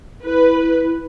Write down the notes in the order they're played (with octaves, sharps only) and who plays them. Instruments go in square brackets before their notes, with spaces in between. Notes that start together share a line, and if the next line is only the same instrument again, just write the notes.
[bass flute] E4 [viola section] B4